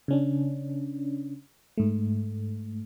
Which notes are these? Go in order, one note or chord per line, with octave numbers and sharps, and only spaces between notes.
C#3 C#4 D4
G#2 A3